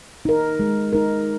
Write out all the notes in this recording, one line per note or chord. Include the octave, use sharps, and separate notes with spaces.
D#4 A#4
G#3
D#4 A#4